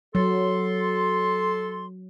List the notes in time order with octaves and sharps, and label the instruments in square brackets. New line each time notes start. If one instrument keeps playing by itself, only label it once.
[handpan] F#3 [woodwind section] A4 C6